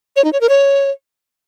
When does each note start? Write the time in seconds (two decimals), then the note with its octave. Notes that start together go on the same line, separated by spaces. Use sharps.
0.16 C#5
0.24 D#4
0.33 C#5
0.41 A#4
0.49 C#5